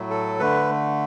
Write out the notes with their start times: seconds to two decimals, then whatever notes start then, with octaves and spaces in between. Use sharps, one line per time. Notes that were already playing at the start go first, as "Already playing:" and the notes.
Already playing: A2 F#3 A3
0.11 A4
0.39 D3 A3 B4